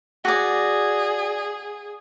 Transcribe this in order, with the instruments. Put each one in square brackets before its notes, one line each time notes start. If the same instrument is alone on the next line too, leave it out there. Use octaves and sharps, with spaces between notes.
[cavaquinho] F#4 D5 [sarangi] G#4